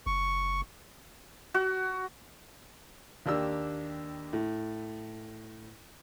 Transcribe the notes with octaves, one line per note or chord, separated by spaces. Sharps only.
F#1 C#6
F#4
D#2 A#3 D4 G4 E6
A2